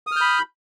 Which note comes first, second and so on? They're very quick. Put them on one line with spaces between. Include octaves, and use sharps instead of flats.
D#6 F6 G6 B5